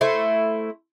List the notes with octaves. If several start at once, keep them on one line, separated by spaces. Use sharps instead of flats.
A3 E4 C5